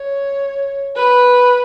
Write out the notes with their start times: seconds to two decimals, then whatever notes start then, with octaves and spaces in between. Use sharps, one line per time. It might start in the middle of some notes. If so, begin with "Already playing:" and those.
Already playing: C#5
0.96 B4